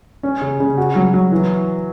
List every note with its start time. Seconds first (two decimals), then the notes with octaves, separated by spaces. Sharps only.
0.23 C#4
0.41 C#3
0.60 C#3
0.78 F#4
0.96 F#3
1.13 F#3
1.32 E3